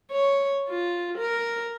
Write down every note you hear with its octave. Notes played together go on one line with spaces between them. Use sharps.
C#5
F4
A#4